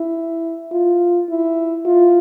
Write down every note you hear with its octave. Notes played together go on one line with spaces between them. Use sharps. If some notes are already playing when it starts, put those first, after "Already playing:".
Already playing: E4
F4
E4
F4